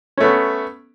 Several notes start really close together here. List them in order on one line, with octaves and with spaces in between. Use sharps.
C#4 A3 B3